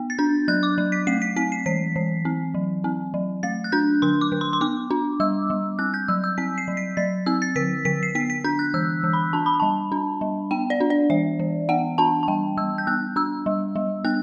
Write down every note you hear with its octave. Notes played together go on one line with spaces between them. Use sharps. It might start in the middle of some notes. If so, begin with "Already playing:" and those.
Already playing: B3
A6
D4 G6
F#3 F#6
D6
F#3
B6
A3 C7
B6
C4 B6
C7
E3 B6
E3
C4
F#3
C4
F#3
A3 A6
F#6
D4 G6
D3 C6
D6
D3
C6
C6
B3 D6
D4
G3 E6
G3
C4 F#6
G6
F#3 E6
E6
C4 B6
C7
F#3
B6
F#3 A6
C4 E6
A6
D3 B6
D3 B6
C7
B3 B6
B6
D4 G6
F#6
E3 E6
E3
B5
D4 A5
B5
G3 A5
D4
G3
B3 G5
D5
D4
D5
E3 E5
E3
B3 F#5
D4 A5
A5
G3 G5
G3 E6
G6
B3 F#6
D4 E6
G3
G3
B3 F#6